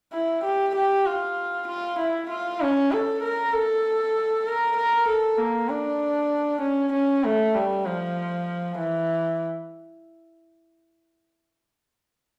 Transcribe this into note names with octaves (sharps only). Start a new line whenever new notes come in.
E4
G4
G4
F4
F4
E4
F4
C#4
A4
A#4
A4
A#4
A#4
A4
A#3
D4
C#4
C#4
A3
G3
F3
E3